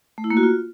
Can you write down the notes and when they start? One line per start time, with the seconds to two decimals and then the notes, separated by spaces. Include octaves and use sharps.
0.18 A3
0.24 E4
0.30 A#3
0.37 F#4
0.43 F4